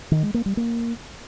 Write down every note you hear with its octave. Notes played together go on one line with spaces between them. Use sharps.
D#3
G#3
A#3
G3
A#3